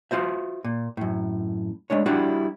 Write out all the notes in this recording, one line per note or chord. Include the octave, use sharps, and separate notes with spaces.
F4 F#4 C5 E5
A#2
F#2 A2
G#3 A3 D4 C#5
G3 D4 E4 F#4 F#5